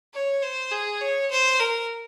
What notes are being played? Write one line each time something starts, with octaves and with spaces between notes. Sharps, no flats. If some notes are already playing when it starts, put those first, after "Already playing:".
C#5
C5
G#4
C#5
C5
A#4